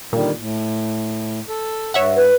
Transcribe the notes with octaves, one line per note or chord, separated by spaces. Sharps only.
A#2 D3 D#3 G3
A2
A4
G2 C#5 E5 F#5
B4